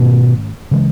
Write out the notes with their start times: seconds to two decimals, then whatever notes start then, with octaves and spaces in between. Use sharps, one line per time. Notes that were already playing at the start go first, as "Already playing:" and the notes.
Already playing: G#2 B2 D#3 A3 C#4
0.71 C#3 E3 G#3